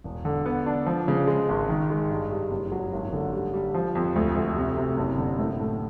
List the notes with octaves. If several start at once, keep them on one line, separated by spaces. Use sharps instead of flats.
E1
D3
B3
D4
F3
C#3
G#3
G#1
D#3
G#3
G2
G3
F#1
F#3
G#1
D3
G3
G3
F3
F2
D2
D2
C3
C3
F#1
D3
A2
A3